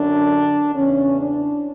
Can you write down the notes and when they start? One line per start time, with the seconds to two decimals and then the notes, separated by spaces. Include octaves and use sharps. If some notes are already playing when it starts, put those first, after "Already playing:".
Already playing: F#2 D3 D4
0.74 E2 C#3 E3 C#4
1.20 D4